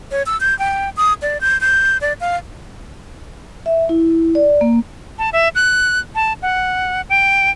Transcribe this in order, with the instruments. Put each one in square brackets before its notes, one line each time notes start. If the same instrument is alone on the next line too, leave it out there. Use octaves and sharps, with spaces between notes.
[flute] C#5
E6
G6
G5
D#6
D5
G6
G6
D5
F5
[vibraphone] E5
E4
D5
A#3
[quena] A5
E5
F#6
A5
F#5
G5